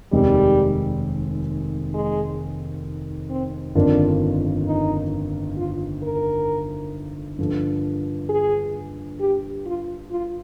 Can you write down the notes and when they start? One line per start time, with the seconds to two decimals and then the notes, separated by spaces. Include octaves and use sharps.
0.12 F1 D#2 D#3 G3 G#3 C4
1.94 G#3
3.30 C4
3.75 G1 F2 D#3 A#3 D4 F4
4.66 D#4
5.57 F4
6.03 A#4
7.39 G2 D3 F3 A#3
8.29 G#4
9.20 G4
9.66 F4
10.11 F4